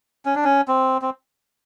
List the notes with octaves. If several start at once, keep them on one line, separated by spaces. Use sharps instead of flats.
C#4
D4
C#4
C4
C4